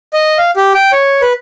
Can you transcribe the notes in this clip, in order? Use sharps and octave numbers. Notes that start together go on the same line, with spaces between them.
D#5
F5
G4
G5
C#5
B4